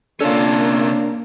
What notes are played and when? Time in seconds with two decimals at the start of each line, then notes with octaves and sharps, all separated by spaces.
0.20 C3 A#3 C#4 D4 F4 A4